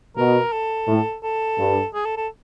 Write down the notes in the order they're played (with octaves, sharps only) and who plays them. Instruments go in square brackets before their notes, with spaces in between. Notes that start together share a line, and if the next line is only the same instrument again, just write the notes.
[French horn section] B2 [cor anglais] A#4
[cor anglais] A4
[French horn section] A2
[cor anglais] A4
[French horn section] G2
[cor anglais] G#4
A4
A4